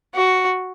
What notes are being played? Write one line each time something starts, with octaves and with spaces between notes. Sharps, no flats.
F#4